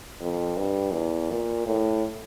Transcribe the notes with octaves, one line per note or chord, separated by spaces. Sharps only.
F2
G2
E2
A#2
A2